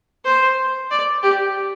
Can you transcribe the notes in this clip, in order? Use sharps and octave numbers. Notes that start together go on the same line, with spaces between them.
C5
D5
G4